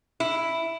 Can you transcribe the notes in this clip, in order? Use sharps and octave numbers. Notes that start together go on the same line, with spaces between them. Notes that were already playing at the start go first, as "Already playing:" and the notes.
E4